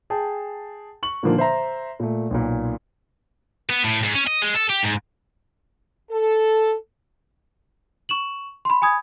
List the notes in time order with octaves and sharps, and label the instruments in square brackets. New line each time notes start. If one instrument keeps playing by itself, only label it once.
[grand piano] G#4 G5 A5
C#6 F#7
A#2 D3 D#3 F3 A#3
C5 E5 A#5
A#2 A3
B1 A#2
[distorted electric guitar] B3
A2
G#2
C#4
D#5
G#3
A4
G4
G#2
[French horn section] A4
[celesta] C#6 E7 F#7
B5 C6
G#5 B5 D#6 G#6